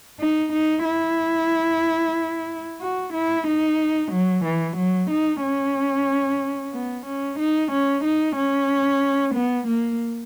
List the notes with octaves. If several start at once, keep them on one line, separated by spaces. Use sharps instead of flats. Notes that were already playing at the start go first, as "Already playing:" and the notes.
D#4
D#4
E4
F#4
E4
D#4
F#3
E3
F#3
D#4
C#4
B3
C#4
D#4
C#4
D#4
C#4
B3
A#3